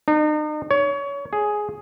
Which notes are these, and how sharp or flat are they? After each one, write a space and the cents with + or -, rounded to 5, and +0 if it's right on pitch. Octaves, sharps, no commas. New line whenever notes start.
D#4 -40
C#5 +25
G#4 +5